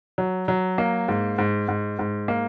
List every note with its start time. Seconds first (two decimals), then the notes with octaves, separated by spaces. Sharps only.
0.18 F#3
0.48 F#3
0.78 A#3
1.08 G#2
1.38 G#2
1.68 G#2
1.99 G#2
2.28 A#3